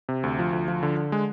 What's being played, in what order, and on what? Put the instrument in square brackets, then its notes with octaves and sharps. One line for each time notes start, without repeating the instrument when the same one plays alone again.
[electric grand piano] C3
D2
F3
D2
F3
D3
D3
G#3